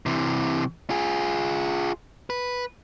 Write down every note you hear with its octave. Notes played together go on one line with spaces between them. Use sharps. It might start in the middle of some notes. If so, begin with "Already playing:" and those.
C3 E3
F4 G#4
B4